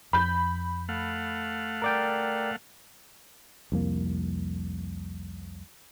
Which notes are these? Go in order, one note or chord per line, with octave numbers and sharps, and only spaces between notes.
F2 B5 G6
A3 F5 F#5
A#4 D5 G5
C2 F2 A#3